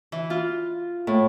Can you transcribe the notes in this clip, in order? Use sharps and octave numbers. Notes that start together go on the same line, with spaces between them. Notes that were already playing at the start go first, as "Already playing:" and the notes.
E3
F4
A2